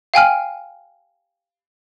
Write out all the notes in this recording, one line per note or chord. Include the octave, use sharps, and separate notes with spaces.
F5 G5 G#5 F6